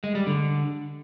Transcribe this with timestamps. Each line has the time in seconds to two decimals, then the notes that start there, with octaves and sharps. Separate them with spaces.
0.04 G#3
0.15 G3
0.27 D3